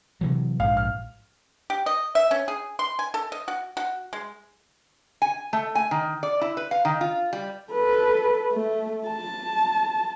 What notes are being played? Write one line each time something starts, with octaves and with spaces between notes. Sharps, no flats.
C3 E3 F#3
A#1 G#2 F5
F6
G4
D#5
E5
C#4
G#4
C6
G#5
A4
D#5
F#4
F#4
G#3
G#5
A3
G#5
D#3
D5
E4
B4
F5
D#3
F4
G3
A4 B4
A3
A5